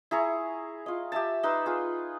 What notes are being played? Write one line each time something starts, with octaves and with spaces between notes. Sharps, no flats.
E4 G#4 A#5 C#6
F4 D#5
G4 E5 G#5 A5
D#4 B4 C6 E6
F4 G#4